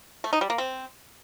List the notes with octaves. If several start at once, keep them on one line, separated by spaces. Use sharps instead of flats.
A3
D#4
G3
A#3
C4